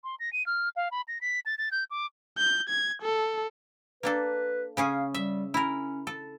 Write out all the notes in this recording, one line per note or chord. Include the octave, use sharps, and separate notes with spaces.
C6
A#6
D#7
F6
F5
B5
A#6
B6
A6
A6
G6
D6
G6
G#6
A4
A#3 D4 A4 B4
C#3 C#4 G#4 F5
G3 E5
C#4 E4 A#4
A4